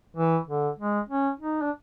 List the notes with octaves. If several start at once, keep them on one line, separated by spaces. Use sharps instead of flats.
E3
D3
G#3
C#4
D#4
D4